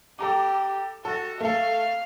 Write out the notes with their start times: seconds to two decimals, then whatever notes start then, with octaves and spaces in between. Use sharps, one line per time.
0.19 G4 A4 A#5 D6
1.05 F#4 A4
1.40 A3 A4 F5